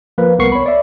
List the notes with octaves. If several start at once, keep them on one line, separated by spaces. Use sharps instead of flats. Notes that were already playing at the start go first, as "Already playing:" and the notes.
F3 A#3 B4
C2 B3 A#4 C#6 C7
C#5 B5
D5 E5